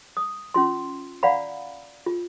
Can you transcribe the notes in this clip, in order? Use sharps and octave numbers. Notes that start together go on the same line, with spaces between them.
D#6
C#4 F4 C6
D5 F5 F#5 A#5 B5
F4